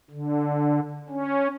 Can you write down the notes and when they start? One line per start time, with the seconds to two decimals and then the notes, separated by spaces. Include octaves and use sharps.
0.11 D3
1.10 C#4